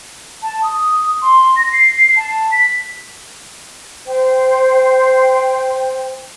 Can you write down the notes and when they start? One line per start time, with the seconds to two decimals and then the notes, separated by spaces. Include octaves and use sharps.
0.42 A5
0.63 D#6
1.22 C6
1.56 A#6
1.72 C7
2.16 A5
2.52 B6
4.07 C5 G5